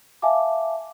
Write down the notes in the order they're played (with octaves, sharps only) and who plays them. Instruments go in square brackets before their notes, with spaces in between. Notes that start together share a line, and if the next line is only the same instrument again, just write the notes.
[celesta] E5 F5 G#5 A5 D6